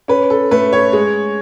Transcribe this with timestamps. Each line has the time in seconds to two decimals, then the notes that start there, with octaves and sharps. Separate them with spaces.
0.08 C#4 B4
0.30 A4
0.51 A3 B4
0.73 C#5
0.93 G#3